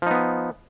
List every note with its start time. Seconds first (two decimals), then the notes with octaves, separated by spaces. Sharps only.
0.02 F3
0.07 D#4
0.11 B3